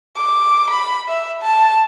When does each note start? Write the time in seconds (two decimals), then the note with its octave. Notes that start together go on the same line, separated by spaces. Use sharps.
0.17 D6
0.70 B5
1.08 E5
1.42 A5